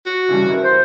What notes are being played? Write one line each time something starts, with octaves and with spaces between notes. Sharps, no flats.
F#4
G2 C#3 E3
E4 A#4
C5